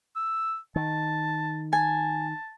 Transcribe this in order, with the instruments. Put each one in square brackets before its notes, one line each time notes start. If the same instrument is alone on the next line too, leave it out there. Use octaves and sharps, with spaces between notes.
[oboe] E6
[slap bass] D#3 [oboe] A5
[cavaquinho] G#5 [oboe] A5